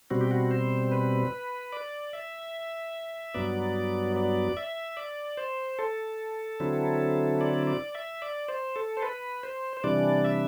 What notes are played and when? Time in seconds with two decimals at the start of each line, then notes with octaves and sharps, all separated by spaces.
0.10 B2 G3 C4 F#4
0.21 G4
0.31 F#4
0.51 C5
0.92 B4
1.73 D5
2.13 E5
3.34 G2 F#3 B3 D5
4.16 D5
4.57 E5
4.97 D5
5.37 C5
5.79 A4
6.60 D3 F#3 C4 E4
7.41 D5
7.67 D5
7.95 E5
8.22 D5
8.48 C5
8.76 A4
8.97 C5
9.02 B4
9.43 C5
9.77 C5
9.84 C3 E3 G3 D4 D5
10.24 E5